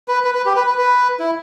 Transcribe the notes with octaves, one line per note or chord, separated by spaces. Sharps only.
B4
B4
B4
G4
B4
B4
B4
E4